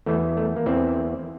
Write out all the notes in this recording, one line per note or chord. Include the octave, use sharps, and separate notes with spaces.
E2 E3 A3
A3
A#3
E2 E3 C4